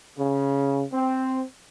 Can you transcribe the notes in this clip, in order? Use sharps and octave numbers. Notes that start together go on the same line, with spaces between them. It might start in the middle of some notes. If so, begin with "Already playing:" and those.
C#3
C4